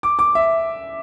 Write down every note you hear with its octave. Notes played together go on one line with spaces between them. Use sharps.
D6
D6
E5